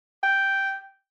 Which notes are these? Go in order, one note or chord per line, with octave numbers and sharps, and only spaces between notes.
G5